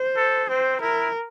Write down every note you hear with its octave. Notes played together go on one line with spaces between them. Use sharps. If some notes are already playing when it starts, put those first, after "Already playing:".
Already playing: C5
A4
C4 C5
E4 A#4